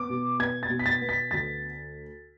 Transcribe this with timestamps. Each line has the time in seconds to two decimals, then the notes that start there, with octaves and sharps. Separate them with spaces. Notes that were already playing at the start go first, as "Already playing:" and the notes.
Already playing: B3 D6
0.10 B2
0.40 B3 G#6
0.63 A6
0.70 B2
0.79 B6
0.86 A6
1.01 B3
1.09 B6
1.31 D2 A6